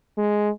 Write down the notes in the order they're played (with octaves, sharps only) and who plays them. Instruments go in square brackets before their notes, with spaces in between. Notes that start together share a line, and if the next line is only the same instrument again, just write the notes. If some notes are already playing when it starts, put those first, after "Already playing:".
[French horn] G#3